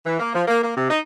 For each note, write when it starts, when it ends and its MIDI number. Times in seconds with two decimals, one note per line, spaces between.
0.06 0.16 52
0.19 0.32 58
0.34 0.43 53
0.48 0.60 58
0.62 0.72 58
0.75 0.87 48
0.90 0.99 63